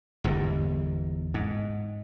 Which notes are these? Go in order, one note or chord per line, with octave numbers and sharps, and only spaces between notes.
G1 E2 G#2 E3
G#2